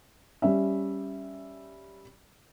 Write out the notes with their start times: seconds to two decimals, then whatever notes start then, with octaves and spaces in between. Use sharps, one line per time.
0.42 G3 C#4 E5